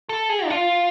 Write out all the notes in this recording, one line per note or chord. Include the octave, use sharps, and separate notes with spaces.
A4
G#4
D4
F4